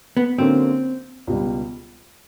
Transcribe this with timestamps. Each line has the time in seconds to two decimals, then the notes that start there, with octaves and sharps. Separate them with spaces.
0.17 B3
0.38 D3 F#3 A#3 C4 C#4
1.27 C#2 B2 G3